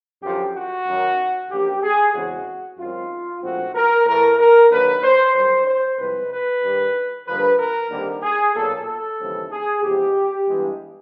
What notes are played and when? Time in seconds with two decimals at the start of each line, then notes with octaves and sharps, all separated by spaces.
0.22 F#2 D3 F3 G4
0.54 F#4
0.87 F#2 D#3 F#3
1.51 F#2 D3 F3 A#3 G4
1.82 G#4
2.14 E2 C#3 E3 G#3 C4 F#4
2.78 F#2 D#3 G#3 C4 F4
3.42 A#1 G#2 F3 A3 C4 F#4
3.75 A#4
4.06 A2 E3 A3 A#4
4.39 A#4
4.71 D#2 D3 F#3 A#3 B4
5.02 C5
5.34 F#2 D#3 G3 C5
5.66 C5
5.98 C2 C3 F3 G#3 B4
6.31 B4
6.63 G2 D#3 G3
7.27 G2 D3 F3 A#3 B4
7.59 A#4
7.90 D#2 D3 G3 C4
8.23 G#4
8.55 B1 A#2 F#3 A#3 A4
8.86 A4
9.19 D#2 C#3 E3 G3 C4
9.51 G#4
9.82 E2 C3 F3 G#3 B3 G4
10.47 G2 E3 G#3 B3